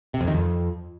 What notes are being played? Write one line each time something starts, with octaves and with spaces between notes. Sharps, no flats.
C3
F2
D#3
F2